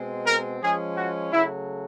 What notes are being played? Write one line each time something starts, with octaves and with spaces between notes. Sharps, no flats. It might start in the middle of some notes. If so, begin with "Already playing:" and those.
Already playing: B2 G#3 C4
A#4
F3 G#3 C#4 G#4
F#4
C#3 F#3 A3 E4